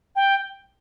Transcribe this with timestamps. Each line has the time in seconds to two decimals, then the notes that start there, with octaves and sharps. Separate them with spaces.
0.15 G5